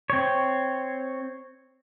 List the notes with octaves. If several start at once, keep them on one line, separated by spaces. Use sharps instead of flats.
C4 C#5